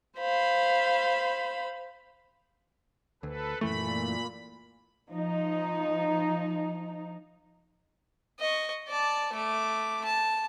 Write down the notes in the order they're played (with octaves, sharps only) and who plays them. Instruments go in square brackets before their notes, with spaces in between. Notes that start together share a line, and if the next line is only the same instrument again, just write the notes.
[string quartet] C5 F5 B5
[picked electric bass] D2 [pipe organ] A4 B4
[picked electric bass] F#2 E3 A3 [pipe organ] A#2 B5
[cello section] F3 D#4
[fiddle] D#5 C#6
D5 A5
A3 D6
A5